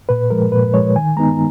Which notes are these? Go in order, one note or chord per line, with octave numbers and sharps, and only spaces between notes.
A#2 B4
F3 G#3 A#4
A#2 B4
F3 G#3 C#5
D#3 G#5
G#3 B3 D#4 A#5